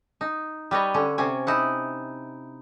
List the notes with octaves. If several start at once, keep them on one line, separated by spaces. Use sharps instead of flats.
D#4
G3 B4 C#5 D#5
D3 C#4
C3 C#4 G#5
D#4 E4 F#5